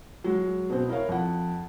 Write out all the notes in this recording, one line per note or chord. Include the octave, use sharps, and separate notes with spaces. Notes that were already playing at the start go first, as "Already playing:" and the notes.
F#3 G#3
B2 C4
E4 A#4 C#5 F5
F2 F#5